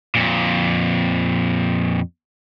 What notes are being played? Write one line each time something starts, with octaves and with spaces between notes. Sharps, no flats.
F2 A#2